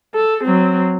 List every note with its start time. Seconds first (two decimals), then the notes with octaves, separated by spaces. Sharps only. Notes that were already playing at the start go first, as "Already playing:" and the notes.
0.15 A4
0.44 F#3 C4